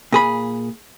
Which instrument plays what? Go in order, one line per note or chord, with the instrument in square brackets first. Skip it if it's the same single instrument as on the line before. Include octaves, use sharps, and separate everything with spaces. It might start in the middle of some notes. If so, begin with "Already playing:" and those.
[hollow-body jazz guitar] A#2 G#4 B5